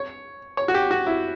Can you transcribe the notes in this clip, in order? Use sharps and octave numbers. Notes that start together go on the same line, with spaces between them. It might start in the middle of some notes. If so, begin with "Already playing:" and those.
Already playing: C#5
C#5
F#4
G4
F#4
E4